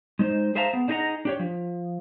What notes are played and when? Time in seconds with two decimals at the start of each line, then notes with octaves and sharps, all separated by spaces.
0.19 G#3 D#4 C5
0.55 G#4 C5 E5 F5 A5 A#5
0.73 B3
0.88 D4 D#4 G#4 D#5 F#5 A#5
1.25 D4 G4 C#5
1.39 F3